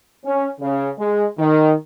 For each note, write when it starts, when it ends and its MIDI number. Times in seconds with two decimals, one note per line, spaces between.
0.24 0.48 61
0.60 0.90 49
0.99 1.25 56
1.38 1.72 51